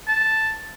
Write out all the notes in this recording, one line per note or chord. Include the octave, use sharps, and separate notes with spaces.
A5